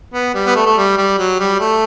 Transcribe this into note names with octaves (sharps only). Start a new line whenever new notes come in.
B3
G3
B3
A3
A3
G3
G3
F#3
G3
A3